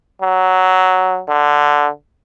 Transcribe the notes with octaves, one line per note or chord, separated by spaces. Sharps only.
F#3
D3